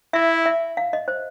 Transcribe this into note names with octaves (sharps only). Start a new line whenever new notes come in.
E4 E5
E5
F5
D#5
C5